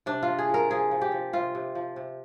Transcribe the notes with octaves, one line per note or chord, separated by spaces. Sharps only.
C3 D4
F4
F3
G#4
F3 A#4
F3 G#4
F3
G4
F3
C3 F4
C3
F3
C3